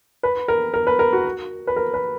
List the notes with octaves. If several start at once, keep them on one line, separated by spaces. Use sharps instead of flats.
B4
A#4
A#4
B4
A#4
F#4
B4
A#4
B4